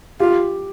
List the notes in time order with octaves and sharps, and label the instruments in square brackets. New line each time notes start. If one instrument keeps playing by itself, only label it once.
[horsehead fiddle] F4 [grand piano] G4